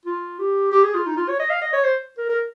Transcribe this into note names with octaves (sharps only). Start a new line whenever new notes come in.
F4
G4
G4
G#4
F4
D#4
F4
C#5
D#5
F5
D#5
C#5
C5
A#4
A#4